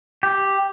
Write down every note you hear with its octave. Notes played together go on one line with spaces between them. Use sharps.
G4